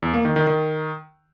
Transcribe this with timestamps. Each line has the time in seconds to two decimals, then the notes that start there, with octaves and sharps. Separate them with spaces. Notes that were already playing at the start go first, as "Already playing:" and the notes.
0.02 E2
0.14 A#3
0.25 D#3
0.36 D#3
0.47 D#3